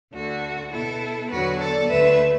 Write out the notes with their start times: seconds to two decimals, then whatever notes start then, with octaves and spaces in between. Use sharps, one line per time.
0.13 D2 D3 A3 F#4
0.72 B2 B3 E4 A4
1.30 E2 D3 F#3 F#4 B4
1.60 A4 D5
1.89 D2 D3 A3 B4 E5